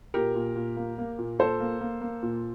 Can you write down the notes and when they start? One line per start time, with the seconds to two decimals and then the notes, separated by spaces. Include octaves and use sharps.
0.14 A#2 G4 A#4
0.35 A#2
0.56 A#2
0.77 A#3
0.98 A#3
1.19 A#2
1.39 A#2 A4 C5
1.60 A#3
1.81 A#3
2.01 A#3
2.22 A#2